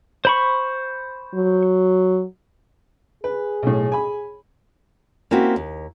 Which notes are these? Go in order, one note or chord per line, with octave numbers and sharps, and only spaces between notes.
C5 B5 C#6
F#3
G#4 B4
B1 A2
G#5 B5
A#3 C4 C#4 E4 F#4 G4
D#2